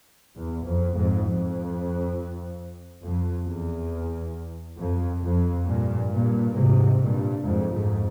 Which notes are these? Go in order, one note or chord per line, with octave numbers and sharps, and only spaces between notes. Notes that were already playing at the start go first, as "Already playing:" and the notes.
E2
F2
F2 G#2
F2
F2
E2
F2
F2
G2 A#2
G2 A#2
G#2 C3
G2 A#2
F2 G#2
F2 G#2